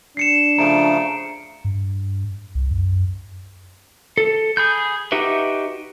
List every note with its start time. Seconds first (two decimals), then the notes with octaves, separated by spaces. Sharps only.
0.17 D4 C7 C#7 E7
0.58 C#3 F3 A3 A#5 D7
1.65 G2
2.55 C2
2.71 F#2
4.18 A4
4.57 G#4 B5 G6
5.12 D#4 F#4 G4 B4 E5